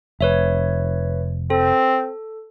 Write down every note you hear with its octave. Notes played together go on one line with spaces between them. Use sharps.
F1 B4 C#5 E5
C4 A4